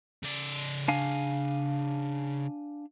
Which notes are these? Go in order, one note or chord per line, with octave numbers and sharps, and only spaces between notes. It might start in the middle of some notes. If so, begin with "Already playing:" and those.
C#3 D5
D4 F5 G#5